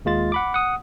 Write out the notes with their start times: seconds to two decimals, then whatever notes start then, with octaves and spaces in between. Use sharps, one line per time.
0.05 D#2 G#3 F4 A6
0.32 F#5 B5 D6
0.54 F#5 D#6